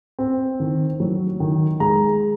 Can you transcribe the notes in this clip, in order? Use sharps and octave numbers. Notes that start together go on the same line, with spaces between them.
C4
D#3
F#3
D#3
G#3 A#5